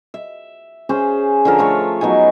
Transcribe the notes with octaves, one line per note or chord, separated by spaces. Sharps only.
E5
C#4 G#4 C5
D3 F3 A#4
A3 F4 C#5
F#3 B3 D#4 G#5